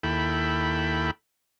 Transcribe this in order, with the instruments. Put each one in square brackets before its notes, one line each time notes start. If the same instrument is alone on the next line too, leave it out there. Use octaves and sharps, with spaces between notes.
[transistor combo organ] D#2 E4 A4 G5 B5